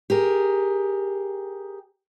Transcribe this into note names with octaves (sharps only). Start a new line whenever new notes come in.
G4 G#4 A#4